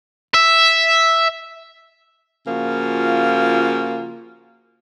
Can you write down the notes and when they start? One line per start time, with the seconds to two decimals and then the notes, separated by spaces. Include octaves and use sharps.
0.34 E5
2.47 C#3 F3 A#3 F4 F#4